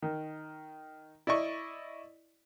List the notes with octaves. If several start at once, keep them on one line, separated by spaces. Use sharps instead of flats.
D#3
E4 D5 D#5 C#6